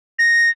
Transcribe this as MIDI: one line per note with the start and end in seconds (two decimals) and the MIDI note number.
0.19 0.49 94